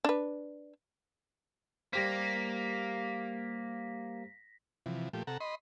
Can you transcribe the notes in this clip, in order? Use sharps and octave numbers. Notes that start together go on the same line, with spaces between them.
D4 B4
G3 A#3 G4 C5 A#6 B6
C3 E3 F3
A#2 F3 A3 G4
C3 A4 F#5 A#5
D#5 B5 C6